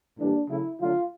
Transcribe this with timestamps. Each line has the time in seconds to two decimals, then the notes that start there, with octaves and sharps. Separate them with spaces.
0.18 A2 E3 G3 A#3 D4
0.48 C#3 F#3 A3 E4
0.79 D3 F#3 A3 F4